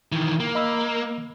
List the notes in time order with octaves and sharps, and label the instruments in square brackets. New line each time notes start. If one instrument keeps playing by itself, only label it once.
[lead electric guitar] D#3 E3
A#3
[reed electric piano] D#5 B5 E6